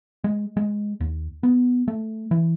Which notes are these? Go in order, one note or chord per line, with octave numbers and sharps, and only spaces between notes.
G#3
G#3
D#2
B3
A3
E3